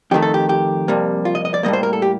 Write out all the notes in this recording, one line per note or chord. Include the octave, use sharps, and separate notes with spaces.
F2 D#3 A3 G4
A4
G4
G4
F2 C3 G3 A#3
F4
D#5
D#5
D5
A2 G3 A#3 D#5
C5
A#4
A4
G4